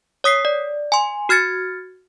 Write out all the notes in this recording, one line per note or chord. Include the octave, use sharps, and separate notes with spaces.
C#5 D#6 B6 C7
D5
G#5 C6
F#4 F6 G#6 A6 C#7